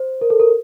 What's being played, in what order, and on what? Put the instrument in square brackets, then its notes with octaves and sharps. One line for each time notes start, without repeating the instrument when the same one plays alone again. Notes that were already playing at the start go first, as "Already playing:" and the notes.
Already playing: [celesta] C5
A#4
A4
A#4